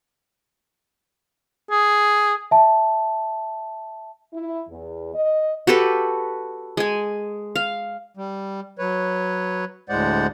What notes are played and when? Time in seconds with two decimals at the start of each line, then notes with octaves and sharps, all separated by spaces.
1.71 G#4
2.51 E5 A5
4.34 E4
4.69 E2
5.15 D#5
5.67 F#4 G4 A4 B4
6.77 G#3 G#5
7.56 F5
8.17 G3
8.79 F#3 B4 C#5
9.89 D2 A2 G#3 C5 D5 F#5